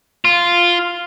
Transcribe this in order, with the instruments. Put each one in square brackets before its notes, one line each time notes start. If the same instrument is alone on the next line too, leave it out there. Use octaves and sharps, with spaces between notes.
[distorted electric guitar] F4